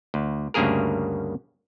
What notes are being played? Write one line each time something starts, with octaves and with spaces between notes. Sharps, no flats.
D2
D2 G2 C#3 A#3 G#4 A#4